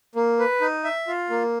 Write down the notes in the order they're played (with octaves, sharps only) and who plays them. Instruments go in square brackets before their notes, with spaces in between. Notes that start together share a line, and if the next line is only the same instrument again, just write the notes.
[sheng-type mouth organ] A#3
B4
D#4
E5
F4
A#3